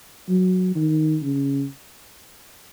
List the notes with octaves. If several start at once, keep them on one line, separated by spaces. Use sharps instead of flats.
F#3
D#3
C#3